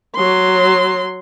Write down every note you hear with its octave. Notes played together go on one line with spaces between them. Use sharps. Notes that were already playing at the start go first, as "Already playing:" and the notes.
F#3 C6